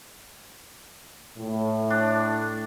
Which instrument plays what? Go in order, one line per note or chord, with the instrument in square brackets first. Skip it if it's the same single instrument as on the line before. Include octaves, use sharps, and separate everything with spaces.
[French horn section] A2
[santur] D4